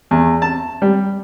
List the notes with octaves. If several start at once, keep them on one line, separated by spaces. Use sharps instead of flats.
E2
A5
G3